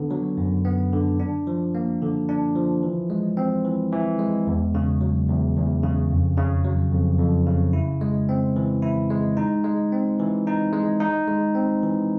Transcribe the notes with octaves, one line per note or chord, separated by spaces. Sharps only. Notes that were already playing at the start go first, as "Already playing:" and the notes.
Already playing: D3 B3
F#3
F#2
B3
D3
D4
F3
A#3
D3
D4
F3
E3
G#3
C4
E3
E3
G#3
E2
C#3
F#3
E2
E2
C#3
F2
C#3
F#3
F2
F2
C#3
E4
G#3
C4
E3
E4
G#3
D#4
G#3
C4
E3
D#4
G#3
D#4
G#3
C4
E3